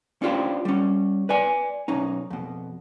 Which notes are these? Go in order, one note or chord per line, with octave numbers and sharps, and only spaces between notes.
C#4 D4 F4 G4 C5
G3 C#4
B4 D5 G#5
B1 C#4 D#4
F2 B2